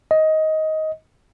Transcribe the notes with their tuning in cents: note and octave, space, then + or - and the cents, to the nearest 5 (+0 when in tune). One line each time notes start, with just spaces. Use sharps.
D#5 +15